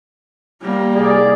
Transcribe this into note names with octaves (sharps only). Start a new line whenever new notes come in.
G3 A#3
C2 G#2 G#4 D5